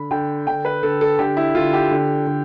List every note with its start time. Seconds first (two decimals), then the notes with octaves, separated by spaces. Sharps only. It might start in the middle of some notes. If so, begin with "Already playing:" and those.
Already playing: D3 B5
0.11 D3 G5
0.47 D3 G5
0.65 B4
0.83 D3 A4
1.01 A4
1.19 D3 G4
1.37 E4
1.55 D3 F4
1.73 G4
1.91 D3
2.27 D3